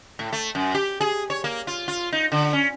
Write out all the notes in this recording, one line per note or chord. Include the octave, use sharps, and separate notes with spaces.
A2
A3
F#2
G4
G#4
C#5
A#3
F4
F4
D#4
D3
C#4